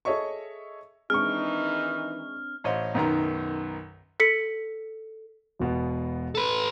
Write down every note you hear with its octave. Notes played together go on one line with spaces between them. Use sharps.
G#4 A4 C#5 D#5 E5 C#6
D#3 E3 G#3 C4 D4 D#4 C#6 F6
A1 C5 C#5 D#5 C6
B1 F#2 D#3 B3 A#5
A4 B6 C#7
E1 B2 B3
A4 B4